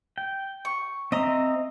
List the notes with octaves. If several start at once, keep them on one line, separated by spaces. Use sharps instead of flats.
G5
C#6
C4 D#5 E5 A#5